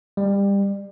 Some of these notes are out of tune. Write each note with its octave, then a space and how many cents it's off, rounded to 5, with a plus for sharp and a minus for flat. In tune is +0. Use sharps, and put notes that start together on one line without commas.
G3 +25